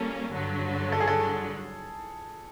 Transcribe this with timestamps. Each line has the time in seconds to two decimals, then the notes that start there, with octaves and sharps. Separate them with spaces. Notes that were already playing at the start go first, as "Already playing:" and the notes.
Already playing: G3 A#3 C#4 A4 A#4
0.31 G2 D3 F#3
0.92 A4
1.00 G#4
1.08 A4